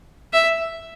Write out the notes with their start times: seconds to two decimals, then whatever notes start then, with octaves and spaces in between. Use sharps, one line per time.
0.33 E5